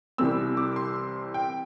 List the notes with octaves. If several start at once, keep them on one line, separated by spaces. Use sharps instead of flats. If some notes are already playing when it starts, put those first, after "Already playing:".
C2 C3 E3 G3 C4 E6
D6
C6
G5